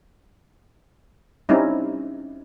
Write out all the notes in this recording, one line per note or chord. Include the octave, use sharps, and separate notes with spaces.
G3 C4 C#4 D#4 E4